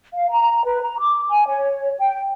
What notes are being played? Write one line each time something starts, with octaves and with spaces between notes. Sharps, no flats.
F5
A#5
B4
A#5
D6
G#5
C#5
G5